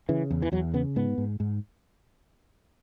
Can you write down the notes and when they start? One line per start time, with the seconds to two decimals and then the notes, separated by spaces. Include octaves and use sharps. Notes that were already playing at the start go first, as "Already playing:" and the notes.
0.09 C#3 E3
0.31 E2
0.42 E3
0.52 E2 F#3
0.74 C#3 B3
0.96 G#2 B3
1.18 G#2
1.40 G#2